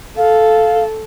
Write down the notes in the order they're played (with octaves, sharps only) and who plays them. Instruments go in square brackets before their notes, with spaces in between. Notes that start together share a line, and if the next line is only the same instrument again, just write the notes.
[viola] A4 [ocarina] F5